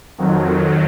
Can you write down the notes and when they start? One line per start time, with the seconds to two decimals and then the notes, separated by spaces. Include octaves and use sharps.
0.18 F2 D#3 F#3